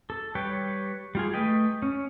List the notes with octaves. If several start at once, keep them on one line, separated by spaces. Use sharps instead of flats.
A4
G3 B4 C#5 G5
G3 F4 G#4
A3 B4 D#5 G5
C#4